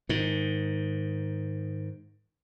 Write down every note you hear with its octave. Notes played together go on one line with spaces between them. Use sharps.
G#2 D#3